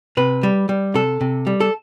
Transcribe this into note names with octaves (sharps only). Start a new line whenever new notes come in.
C3 B4
G3
G3
C3 A4
C3
G3
A4